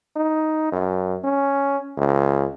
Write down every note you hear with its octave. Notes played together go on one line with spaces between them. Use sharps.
D#4
F#2
C#4
C#2